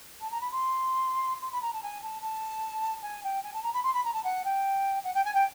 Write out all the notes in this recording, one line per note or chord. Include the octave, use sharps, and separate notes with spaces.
A5
A#5
B5
C6
C6
B5
A#5
A5
G#5
A5
A5
G#5
G5
G#5
A5
A#5
B5
C6
B5
A#5
A5
F#5
G5
F#5
G5
G#5
G5